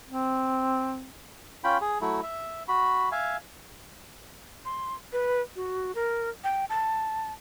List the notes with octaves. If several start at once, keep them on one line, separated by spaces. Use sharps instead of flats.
C4
C#4 F4 G5 B5
G#4
F#3 A3 E4
E5
F#4 B5
E5 F5 G#5
C6
B4
F#4
A#4
G5
A5